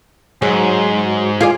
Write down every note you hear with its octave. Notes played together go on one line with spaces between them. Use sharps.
G#2 F#3 G#4
F4 G#4 D5